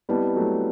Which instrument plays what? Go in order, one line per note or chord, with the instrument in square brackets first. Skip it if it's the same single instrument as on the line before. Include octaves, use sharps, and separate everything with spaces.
[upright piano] G3 B3 [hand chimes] C4 E4 B4 D#5 A5
[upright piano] F#3 A3